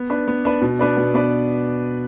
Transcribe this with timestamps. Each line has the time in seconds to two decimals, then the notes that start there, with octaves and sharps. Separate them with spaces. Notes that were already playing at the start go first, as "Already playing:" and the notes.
Already playing: B3
0.10 D4 B4
0.28 B3
0.45 D4 B4
0.61 B2
0.79 B3 D4 B4 D5
0.97 B2
1.14 B3 D4 B4 D5